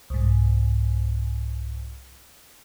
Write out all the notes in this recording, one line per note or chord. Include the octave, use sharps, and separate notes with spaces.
C2 G#2